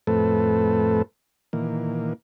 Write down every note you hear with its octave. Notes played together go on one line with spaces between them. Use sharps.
F2 A2 A3 C4 A4 B4
A#2 D#3 E3 A#3